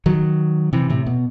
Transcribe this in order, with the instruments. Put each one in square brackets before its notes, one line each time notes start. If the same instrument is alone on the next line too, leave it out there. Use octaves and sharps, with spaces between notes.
[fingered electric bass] D#3 F#3
C3 E3
A2 C3
B2